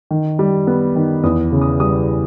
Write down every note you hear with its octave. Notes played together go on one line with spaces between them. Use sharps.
D#3
G3
B3
D#3
E2 D#6
C#3
D#6
G3 D#6